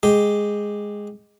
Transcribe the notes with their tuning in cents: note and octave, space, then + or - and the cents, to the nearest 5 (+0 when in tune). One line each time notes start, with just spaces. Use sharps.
G#3 -5 G4 +0